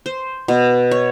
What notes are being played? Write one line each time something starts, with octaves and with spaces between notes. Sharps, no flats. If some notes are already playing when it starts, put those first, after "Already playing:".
C5
B2
C#5